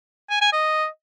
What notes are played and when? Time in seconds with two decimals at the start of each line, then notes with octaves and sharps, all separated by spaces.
0.30 G#5
0.41 G#5
0.52 D#5